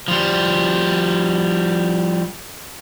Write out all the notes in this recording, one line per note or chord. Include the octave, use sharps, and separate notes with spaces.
F3 G3